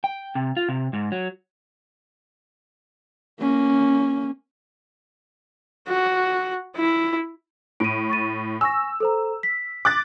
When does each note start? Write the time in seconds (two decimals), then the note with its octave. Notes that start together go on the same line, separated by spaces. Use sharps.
0.04 G5
0.35 C3
0.57 F4
0.69 C3
0.93 G#2
1.12 F#3
3.40 A#3 C#4
5.88 F#4
6.77 E4
7.80 A2 D7 D#7
8.10 C#6 A6 D#7
8.61 G#5 C#6 E6 A#6
9.00 A4 C5 A#5
9.43 B6
9.85 D6 F#6 A6